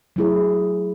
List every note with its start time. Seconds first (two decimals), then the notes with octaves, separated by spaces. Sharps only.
0.16 F#3 A3 E4 G#4